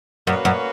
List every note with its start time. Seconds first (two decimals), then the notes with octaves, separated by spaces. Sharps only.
0.27 F#2 A#3 C#4 F#4 B4
0.45 F#2